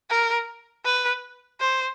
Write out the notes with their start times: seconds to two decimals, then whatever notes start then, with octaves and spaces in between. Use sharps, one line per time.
0.10 A#4
0.85 B4
1.61 C5